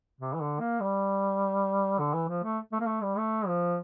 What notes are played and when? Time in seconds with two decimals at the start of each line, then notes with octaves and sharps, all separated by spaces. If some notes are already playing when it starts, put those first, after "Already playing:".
0.21 C3
0.34 E3
0.41 D3
0.60 A#3
0.80 G3
1.99 D3
2.14 E3
2.28 F3
2.44 A3
2.73 A3
2.80 A#3
2.87 A3
3.03 G3
3.18 A3
3.47 F3